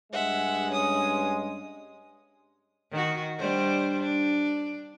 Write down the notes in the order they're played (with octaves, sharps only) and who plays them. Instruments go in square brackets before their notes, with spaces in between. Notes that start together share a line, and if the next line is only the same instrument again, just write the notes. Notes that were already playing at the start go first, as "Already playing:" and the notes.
[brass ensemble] G2 G#3 [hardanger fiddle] E5 F#5
[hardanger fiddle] C#4 D#6
[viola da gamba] D#3 F#4
G3 D4 C5
D4